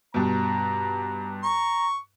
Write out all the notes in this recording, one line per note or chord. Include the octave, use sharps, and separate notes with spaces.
G2 B2 A#5
A#5 C#6